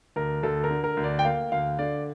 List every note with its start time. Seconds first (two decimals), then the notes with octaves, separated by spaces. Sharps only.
0.16 D2 A#4
0.43 D2 A4
0.64 A#4
0.70 D3
0.84 A#4
0.97 D2
1.04 D5
1.19 G5
1.25 A#3 F5
1.52 D2 F5
1.79 D3 D5